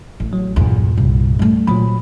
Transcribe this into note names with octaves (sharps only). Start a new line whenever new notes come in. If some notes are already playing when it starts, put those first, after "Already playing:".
A1
F#3
B1 E2 G2 A#2
C2
G3 A3
A#2 F3 F#3 B5